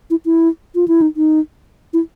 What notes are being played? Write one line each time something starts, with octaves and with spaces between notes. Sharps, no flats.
E4
E4
F4
E4
D#4
D#4
E4